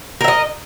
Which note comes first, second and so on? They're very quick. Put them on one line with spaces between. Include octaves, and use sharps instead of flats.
A#4 E5 D#5